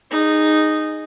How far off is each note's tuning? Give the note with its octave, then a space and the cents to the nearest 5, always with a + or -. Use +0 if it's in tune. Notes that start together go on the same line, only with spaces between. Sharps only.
D#4 -10 G#4 +0